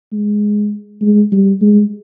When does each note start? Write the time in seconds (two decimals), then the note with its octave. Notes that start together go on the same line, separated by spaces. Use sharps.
0.12 G#3
1.02 G#3
1.32 G3
1.62 G#3